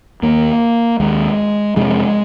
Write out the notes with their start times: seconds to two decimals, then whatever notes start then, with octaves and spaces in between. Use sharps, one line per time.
0.22 D#2 A#3
1.00 D#2 G#3
1.76 F2 C3 G#3